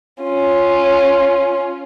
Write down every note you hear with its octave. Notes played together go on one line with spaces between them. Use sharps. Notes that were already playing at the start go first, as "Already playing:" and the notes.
C#4 F4